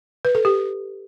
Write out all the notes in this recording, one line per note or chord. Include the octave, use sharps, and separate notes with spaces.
B4
A4
G4